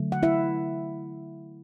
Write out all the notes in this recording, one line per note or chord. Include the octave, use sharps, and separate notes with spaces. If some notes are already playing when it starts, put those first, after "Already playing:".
Already playing: D3 F#3 A3
F#5
E4 E5